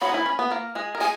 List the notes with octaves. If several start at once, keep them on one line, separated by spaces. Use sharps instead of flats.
F#3 F#4 B5
D#4
E3 E4
C#4
B3
A#3 A#4
G#3 G#4
A#4
G#3 G#4 G#5